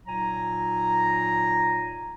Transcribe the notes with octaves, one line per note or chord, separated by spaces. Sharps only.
A#2 F#3 D#4 G#5 A#5